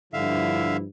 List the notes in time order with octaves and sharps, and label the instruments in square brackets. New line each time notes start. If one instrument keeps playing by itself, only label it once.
[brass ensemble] G2 F3 E4 [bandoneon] D3 E5 F5